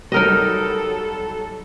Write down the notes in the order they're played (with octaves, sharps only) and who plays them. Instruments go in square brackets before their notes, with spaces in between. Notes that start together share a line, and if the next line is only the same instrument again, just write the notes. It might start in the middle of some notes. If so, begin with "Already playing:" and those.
[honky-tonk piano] F#3 G3 [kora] D#4 A#4 D#5 [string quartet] A4